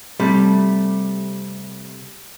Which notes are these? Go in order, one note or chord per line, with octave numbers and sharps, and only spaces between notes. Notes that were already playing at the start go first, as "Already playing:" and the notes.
C3 G3 A3